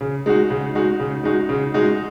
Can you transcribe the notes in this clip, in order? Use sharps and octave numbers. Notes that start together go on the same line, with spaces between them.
C#3
G#3 D#4 F#4
C#3
G#3 D#4 F#4
C#3
G#3 D#4 F#4
C#3
G#3 D#4 F#4